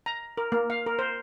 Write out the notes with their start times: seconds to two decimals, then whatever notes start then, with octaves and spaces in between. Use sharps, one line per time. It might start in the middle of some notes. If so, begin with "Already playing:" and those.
0.06 A#5
0.37 A#4
0.52 A#3
0.70 F5
0.86 A#4
0.99 C5